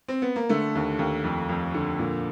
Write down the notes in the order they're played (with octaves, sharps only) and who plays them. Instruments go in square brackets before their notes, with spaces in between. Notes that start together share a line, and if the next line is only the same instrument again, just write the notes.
[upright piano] C4
B3
A#3
D3 A3
D#2
D#2
F2
F2
D3
A#2